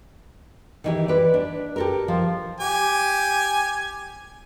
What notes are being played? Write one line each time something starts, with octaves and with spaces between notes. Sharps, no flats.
D#3 E3 G4
B4 D5
D4
G4 A4 A#4
F3
G4 G#5